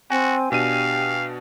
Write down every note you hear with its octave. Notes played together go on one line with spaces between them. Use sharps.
C4 F#4 G5 G#5
B2 D4 G4 F5 D#7